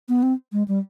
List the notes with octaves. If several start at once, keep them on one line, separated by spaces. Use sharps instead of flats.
B3
C4
G#3
G3